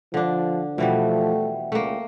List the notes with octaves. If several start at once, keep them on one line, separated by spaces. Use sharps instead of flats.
D3 F3 D4
B2 E3 F3 G3 A3 E5 F#5 G5
C#2 A3 A#3